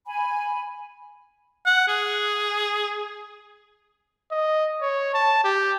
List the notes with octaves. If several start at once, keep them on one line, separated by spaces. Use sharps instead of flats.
G#5 B5
F#5
G#4
D#5
C#5
A5
G4